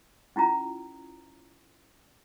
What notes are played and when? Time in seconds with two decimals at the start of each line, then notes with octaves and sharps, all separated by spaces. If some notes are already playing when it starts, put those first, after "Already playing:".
0.36 C#4 E4 F4 A#5